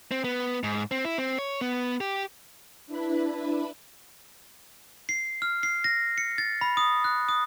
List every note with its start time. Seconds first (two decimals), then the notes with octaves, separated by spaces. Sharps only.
0.11 C4
0.24 B3
0.64 G#2
0.91 C4
1.04 E4
1.18 C4
1.39 C#5
1.61 B3
2.01 G4
2.87 D4 E4 B4 B5
5.09 C7
5.42 F6
5.63 C7
5.84 A#6
6.18 C#7
6.38 A6
6.61 B5
6.77 D#6
7.04 F#6
7.29 D#6